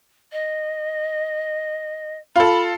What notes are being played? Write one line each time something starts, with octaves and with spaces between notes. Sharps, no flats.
D#5
F4 A4 B5